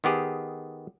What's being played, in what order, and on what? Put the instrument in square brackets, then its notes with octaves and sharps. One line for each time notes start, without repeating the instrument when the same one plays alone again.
[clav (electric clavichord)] D#3 B3 G4 G#4